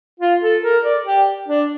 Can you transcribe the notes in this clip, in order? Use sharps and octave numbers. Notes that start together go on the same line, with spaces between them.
F4
A4
A#4
D5
G4
D4